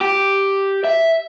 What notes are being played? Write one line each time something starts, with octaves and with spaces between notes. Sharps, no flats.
G4
E5